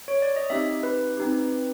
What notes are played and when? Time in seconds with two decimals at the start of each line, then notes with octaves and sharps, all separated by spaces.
0.08 C#5
0.22 D5
0.36 D#5
0.50 C4 D#4 G4 E5
0.83 B4
1.17 C4 D#4 G4